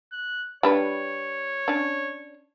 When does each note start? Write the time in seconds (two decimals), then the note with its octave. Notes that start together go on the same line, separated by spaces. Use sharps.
0.12 F#6
0.63 G3 D4 B4 C#5
1.68 C#4 D4